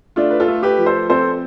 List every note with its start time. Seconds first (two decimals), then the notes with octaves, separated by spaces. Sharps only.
0.16 A3 D4 F4
0.30 B4
0.40 F4 A4
0.48 A3
0.63 G4 B4
0.78 F3
0.86 A4 C5
1.10 C4 A4 C5